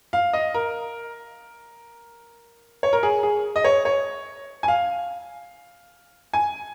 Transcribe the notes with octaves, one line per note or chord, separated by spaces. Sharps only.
F5
D#5
A#4
C#5
A#4
G#4
G#4
D#5
C#5
C#5
G#5
F5
G#5